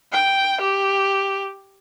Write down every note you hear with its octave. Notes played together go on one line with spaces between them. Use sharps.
G5
G4